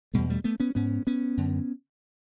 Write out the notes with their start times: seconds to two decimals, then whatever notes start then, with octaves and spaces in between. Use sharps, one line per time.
0.14 E2 B2 G3 A3
0.29 G3 A3
0.44 A3 B3
0.60 B3 C#4
0.75 G#2 B3 C#4
1.07 B3 C#4
1.37 F#2 D3